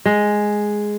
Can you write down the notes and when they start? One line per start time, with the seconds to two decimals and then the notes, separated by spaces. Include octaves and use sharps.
0.06 G#3